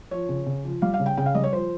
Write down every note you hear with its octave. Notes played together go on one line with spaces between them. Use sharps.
F3 C#5
C#3
C#3
F3
G3 F5
F5
C#3
G5
C#3 G5
F5
G3 D#5
C#5
F3 C5